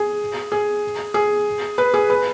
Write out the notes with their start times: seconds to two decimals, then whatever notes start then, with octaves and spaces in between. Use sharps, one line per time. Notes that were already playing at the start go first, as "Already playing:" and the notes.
Already playing: G#4
0.52 G#4
1.14 G#4
1.78 B4
1.94 G#4
2.10 B4